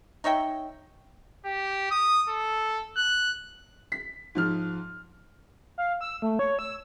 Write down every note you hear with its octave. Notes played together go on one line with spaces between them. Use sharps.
D#4 C#5 E5 G5
G4
D#6
A4
F#6
B6
G#2 F3 F6
F5
E6
A3
C#5
E6